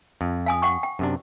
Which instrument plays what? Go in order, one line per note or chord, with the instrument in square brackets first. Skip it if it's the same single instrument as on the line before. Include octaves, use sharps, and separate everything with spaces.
[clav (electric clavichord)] F2
[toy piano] F5 G#5 D#6
F#5 G5 C#6
G5
[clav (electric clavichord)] F#2 C3 D4